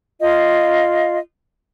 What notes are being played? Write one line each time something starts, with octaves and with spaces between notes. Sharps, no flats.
F4 D#5 F5